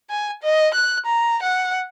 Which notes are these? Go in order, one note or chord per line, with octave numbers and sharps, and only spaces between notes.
G#5
D#5
F#6
A#5
F#5